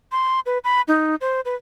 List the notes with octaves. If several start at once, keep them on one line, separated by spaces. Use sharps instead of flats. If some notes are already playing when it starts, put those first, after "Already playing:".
C6
B4
B5
D#4
C5
B4